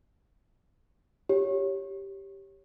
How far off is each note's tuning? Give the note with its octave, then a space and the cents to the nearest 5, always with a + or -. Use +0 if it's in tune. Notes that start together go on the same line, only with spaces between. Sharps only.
G4 +0 C#5 +0